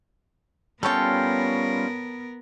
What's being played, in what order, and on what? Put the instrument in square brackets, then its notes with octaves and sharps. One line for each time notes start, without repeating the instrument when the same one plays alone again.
[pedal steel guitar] G3 C#4 F4 [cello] B3 A#4 [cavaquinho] A4 C#5 G5